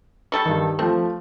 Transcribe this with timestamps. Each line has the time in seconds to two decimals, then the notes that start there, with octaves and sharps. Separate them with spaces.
0.32 G3 A4 C#6
0.46 G2 D#3
0.79 F3 A3 C4